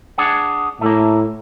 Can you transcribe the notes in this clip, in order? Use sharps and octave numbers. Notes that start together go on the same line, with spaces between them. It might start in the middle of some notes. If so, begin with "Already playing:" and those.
D4 G#4 F#5
A2 A3 A#3